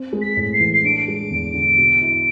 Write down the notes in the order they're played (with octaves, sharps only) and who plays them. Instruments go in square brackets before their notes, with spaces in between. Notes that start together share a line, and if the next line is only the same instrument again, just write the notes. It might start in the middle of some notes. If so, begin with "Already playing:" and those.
Already playing: [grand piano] C4
G#3
[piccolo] B6
[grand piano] A2
[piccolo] B6
C7
[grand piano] E3
[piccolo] C7
[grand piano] D4 [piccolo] D7
[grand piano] G#3
E2
D3
B2
E4